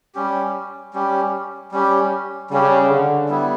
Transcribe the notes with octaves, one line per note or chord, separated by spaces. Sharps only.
G3 C#4 G4
G3 C#4 G4
G3 C#4 G4
C#3 G3 C#4 G4
D3
G3 B3 E4